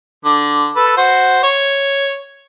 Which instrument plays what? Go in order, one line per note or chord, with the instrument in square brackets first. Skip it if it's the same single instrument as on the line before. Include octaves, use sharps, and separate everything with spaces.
[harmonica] D3
A4 B4
F#4 C5
C#5